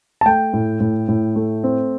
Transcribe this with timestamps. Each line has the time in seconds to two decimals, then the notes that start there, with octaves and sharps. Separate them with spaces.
0.21 A5
0.26 A3 G5
0.53 A2
0.80 A2
1.08 A2
1.36 A3
1.64 C4